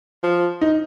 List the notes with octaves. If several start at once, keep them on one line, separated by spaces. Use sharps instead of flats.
F3
D#4